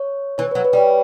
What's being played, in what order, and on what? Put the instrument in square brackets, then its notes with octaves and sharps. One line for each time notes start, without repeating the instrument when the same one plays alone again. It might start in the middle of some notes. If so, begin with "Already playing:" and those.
Already playing: [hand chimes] C#5
[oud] E3 [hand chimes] C#5
[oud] F#3 [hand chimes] B4
[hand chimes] B4
[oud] G3 [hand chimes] C#5